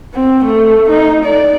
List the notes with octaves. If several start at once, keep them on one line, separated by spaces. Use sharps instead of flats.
C4
A3
D#4
D5